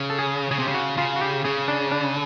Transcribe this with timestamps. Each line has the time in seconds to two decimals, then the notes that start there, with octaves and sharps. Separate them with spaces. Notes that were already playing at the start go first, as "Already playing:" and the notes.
Already playing: C#3
0.10 A4
0.19 G#4
0.51 C#3 G#4
0.59 C3 G4
0.68 C#3
0.74 F#4
0.98 C#3 F4
1.16 F#4
1.21 G4
1.44 C#3 G#4
1.68 D4
1.92 D4